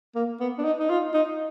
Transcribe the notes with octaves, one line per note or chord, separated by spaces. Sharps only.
A#3
B3
D4
D#4
D#4
F4
D#4